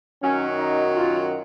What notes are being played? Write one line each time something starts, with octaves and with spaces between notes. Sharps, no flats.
F#2 D#3 F#3 C#4
D#4
F4